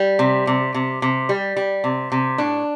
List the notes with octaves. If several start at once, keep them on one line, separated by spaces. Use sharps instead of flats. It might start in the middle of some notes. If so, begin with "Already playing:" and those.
Already playing: G3
C3
C3
C3
C3
G3
G3
C3
C3
A2 D4